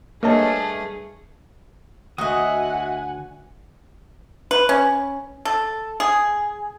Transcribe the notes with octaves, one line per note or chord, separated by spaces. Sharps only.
G2 A3 A#3 G#4 C#5 D#5 A5
D2 F#4 D#5 E5 F#5 G#5 D#6
B4
C#4
A4
G#4